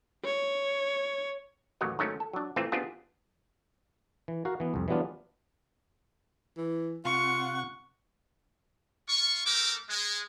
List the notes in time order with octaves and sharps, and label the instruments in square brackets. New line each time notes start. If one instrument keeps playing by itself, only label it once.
[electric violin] C#5
[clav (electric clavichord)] A1 D#2 D#3 F#3 F#4 D#5
G#2 D#3 F#3 A3 C#4
A4
F#3 D4
A#2 E3 A3 C4 F4
B3 C4 D4 F4 G4 G#4
E3
F#4 A#4 F5
E3 B3
C2 F2
E3 F#3 G3 B3 D4 F4
[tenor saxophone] E3
[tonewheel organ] C3 F#5 [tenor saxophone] F4 [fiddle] C#6
[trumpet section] F4 C#6
A3 C4 A4 A#4 D6
G#3